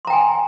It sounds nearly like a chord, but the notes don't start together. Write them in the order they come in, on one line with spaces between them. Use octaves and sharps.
C6 A#5 G5 G#5